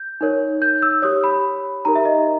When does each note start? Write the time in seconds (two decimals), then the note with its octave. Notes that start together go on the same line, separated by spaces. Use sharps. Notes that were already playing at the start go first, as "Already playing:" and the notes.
Already playing: G6
0.21 D#4 A#4 C#5
0.62 G6
0.82 E6
1.02 G4 C#5 D#6
1.24 B5
1.85 D#4 G4 A#4 A#5
1.95 E5
2.05 D#5